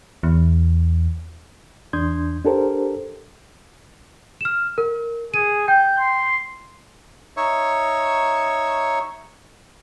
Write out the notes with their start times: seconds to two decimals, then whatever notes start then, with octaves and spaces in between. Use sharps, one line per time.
0.23 E2
1.93 E2 D4 C6 D#6 G6 G#6
2.45 D4 G4 A4 A#4 C5
4.41 F6 E7
4.78 A#4
5.34 G#4 D#7
5.68 G5 G6
5.99 C6
7.37 D#4 C#5 E5 C#6